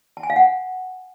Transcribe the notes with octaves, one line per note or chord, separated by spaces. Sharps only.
A5
G#5
F5
F#5